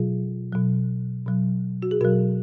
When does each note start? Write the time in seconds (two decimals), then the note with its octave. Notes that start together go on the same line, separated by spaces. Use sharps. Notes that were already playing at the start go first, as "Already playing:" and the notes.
Already playing: B2 F#3 F4 G#4
0.52 B2 F#3
1.26 B2 F#3
1.82 F#4
1.91 G#4
2.00 B2 F#3 F#4 A#4